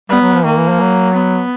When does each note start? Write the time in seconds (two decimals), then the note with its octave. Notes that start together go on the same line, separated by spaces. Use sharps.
0.10 G3 B3
0.21 F#3
0.34 F3
0.45 D#3 A#3
0.57 E3
0.69 F3
0.80 F#3
1.15 B3